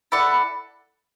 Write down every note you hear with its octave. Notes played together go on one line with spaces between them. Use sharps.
E4 A4 D5 F#5